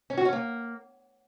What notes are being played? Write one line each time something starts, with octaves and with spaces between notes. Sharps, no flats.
C#4
F#4
C#4
A#3